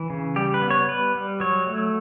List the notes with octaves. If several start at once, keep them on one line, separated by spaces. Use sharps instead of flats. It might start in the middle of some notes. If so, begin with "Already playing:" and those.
Already playing: E3
C#3
G3 G4
B4
B3
C#5
G3 B4
G3
F#3 C#5
A3